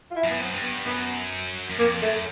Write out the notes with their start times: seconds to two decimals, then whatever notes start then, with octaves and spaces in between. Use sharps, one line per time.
0.11 F4
0.16 E4
0.24 F#2
0.31 B3
0.40 C4
0.54 G2
0.62 B3
0.85 F#2 B3
1.70 F#2
1.79 F2 A#3
2.02 F#2 A3